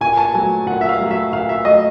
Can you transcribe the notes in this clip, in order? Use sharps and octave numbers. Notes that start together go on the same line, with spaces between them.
A#2 G#5
A5
F#3 A3 G#5
A#2 F#5
E5
F5
F#3 A3
E5
A#2 F5
E5
F#3 A3 D#5